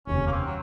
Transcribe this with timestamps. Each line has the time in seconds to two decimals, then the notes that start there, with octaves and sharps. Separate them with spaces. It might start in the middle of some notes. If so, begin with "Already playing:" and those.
0.07 F1 D#2 C#3 C#4
0.27 A#3
0.32 C4
0.46 F#3